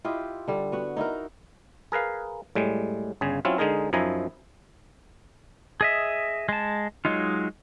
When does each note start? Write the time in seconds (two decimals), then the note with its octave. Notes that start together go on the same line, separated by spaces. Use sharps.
0.05 E4 F4 G4 D#5
0.48 D3 G3
0.72 B3 F#4
0.97 D#4 E4 F#4 A#4
1.92 G#4 A#4 B4 F5
2.55 A2 G3 G#3
3.21 G1 C#3 G#4
3.45 F#3 C4 C#4 E4 F4
3.58 D3 G#3 D#4 G#4 A#4
3.93 F#2 F3 D#4 E4 G#5 A#5
5.81 G#4 D#5 E5
6.49 G#3 A5
7.05 F#3 G#3 D#4 F4